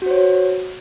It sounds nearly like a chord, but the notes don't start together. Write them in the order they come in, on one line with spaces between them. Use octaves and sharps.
F#4 C5 C#5